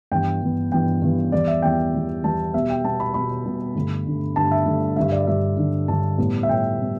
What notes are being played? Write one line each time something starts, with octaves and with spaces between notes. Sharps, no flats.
G2 E3 B3 G5
G2 E3 B3
G2 E3 B3 G5
G2 E3 B3
E2 E3 G3 B3 D5
E5
E2 E3 G3 B3 G5
E2 E3 G3 B3
E2 E3 G3 B3 A5
B2 G3 B3 E5
G5
B2 G3 B3 A5
B5
B2 G3 B3 B5
B2 G3 B3
G2 D3 A3
G2 D3 A3
G2 D3 A3 A5
E5
G2 D3 A3
G2 D3 G3 E5
D5
G2 D3 G3 E5
G2 D3 G3
G2 D3 G3 A5
A2 G3 B3
E5
A2 G3 B3 G5
A2 G3 B3